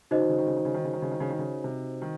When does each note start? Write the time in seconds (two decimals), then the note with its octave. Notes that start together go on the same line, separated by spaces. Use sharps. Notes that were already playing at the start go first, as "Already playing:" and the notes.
0.11 C#3 D#4 F#4 C5 D#5
0.20 D#3
0.29 C#3
0.38 D#3
0.47 C#3
0.56 D#3
0.65 C#3
0.74 D#3
0.84 C#3
0.93 D#3
1.02 C#3
1.11 D#3
1.20 C#3
1.30 D#3
1.39 C#3
1.64 C3
2.02 D#3